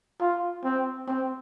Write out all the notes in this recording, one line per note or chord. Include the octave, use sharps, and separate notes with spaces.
F4
C4
C4